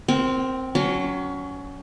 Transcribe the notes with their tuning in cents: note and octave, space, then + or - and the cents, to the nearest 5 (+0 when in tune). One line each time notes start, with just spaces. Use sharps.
C4 +0 A#4 +15 G5 -45
F#3 +0 C#4 +25